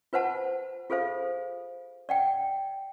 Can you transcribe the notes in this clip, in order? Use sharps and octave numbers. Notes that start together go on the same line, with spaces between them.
F4 B4 C5 F#5 A5
F4 G#4 A4 C5 F5
D5 F#5 G5